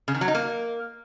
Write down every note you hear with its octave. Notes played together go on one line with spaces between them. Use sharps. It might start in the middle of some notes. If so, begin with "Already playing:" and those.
C#3
D#3
F#3
D#4
A#3